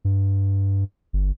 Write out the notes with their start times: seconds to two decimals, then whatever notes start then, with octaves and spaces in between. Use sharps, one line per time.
0.05 G2
1.13 G1